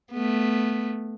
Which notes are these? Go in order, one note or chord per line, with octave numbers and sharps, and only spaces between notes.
A3 B3